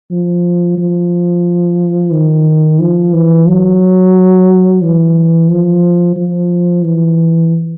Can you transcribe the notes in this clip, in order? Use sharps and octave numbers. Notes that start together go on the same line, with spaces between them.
F3
F3
D#3
F3
E3
F#3
E3
F3
F3
E3